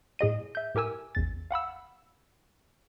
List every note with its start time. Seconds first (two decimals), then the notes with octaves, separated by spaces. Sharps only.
0.19 A2 G#4 D#5 D#7
0.55 E5 G6
0.75 A2 G4 A#4 G#5 E6
1.15 A1 E2 A6
1.51 F5 F#5 B5 E6